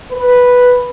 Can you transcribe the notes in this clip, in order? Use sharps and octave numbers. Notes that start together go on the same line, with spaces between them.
B4